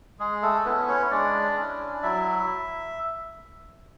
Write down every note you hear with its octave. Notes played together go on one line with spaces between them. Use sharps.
G#3 G#4
A3 A4
B3 C#4 E4 B4
C#4 C#5
C#5
G#3 D4 D5
C#4 E4
F#3 E4 E5